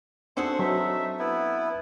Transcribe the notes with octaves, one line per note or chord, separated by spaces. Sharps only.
A3 C4 D4 F#4 G#4 F#5 C6
F#3 D#4 E5
B3 E4